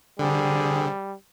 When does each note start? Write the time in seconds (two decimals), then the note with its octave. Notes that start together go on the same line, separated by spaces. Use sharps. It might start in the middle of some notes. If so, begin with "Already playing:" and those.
0.19 D3 G3 C4 G#4